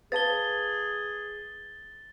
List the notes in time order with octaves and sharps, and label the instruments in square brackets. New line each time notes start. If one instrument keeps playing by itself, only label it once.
[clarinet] G#4 [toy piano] B4 F5 A5 [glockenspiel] A6 G7